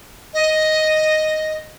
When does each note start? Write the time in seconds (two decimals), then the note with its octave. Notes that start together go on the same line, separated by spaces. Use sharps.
0.34 D#5